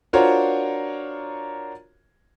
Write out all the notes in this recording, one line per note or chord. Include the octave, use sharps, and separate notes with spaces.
D4 F4 F#4 A#4 C5 C#5